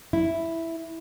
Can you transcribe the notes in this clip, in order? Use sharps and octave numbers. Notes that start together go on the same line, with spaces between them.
E4